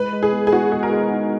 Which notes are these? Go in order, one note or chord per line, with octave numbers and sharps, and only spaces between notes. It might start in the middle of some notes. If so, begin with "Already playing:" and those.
Already playing: G#3 B4
G#3
G#4
B3
G#4
B3 F#4
G#3 G#4
A#4
G#3
D#4